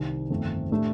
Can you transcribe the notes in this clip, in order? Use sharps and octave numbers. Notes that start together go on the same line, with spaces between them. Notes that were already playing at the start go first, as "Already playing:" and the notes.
Already playing: C2 C3 D#3
G1 F2 D#3 A3 C4
A2 A3 D4 G4